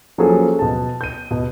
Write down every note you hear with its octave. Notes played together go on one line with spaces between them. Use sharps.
F3 F#3 A#3 C#4 G#4 A4
B2 A5
G6 D#7
B2